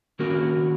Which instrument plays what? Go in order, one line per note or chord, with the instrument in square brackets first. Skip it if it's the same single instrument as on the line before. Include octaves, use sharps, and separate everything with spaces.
[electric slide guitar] D#3 A#3 C#4 F#4 A#4